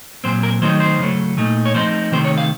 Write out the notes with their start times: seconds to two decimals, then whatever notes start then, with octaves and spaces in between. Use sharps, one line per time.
0.24 A#2 F#3 C4 C5
0.43 A#4
0.61 D#3 F#3 A3 C4 D#4 C5
0.80 C5
1.00 C#3 F#3 A3
1.37 A#2 A3 D#4
1.66 C#5
1.74 F3 A3 C4 D#4 C5
2.12 C3 D#3 A3 C4 C5
2.25 C#5
2.38 F5